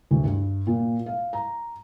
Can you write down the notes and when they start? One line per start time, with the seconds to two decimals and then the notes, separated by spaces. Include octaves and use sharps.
0.11 D2
0.24 G2
0.67 A#2
1.06 F5
1.33 A#5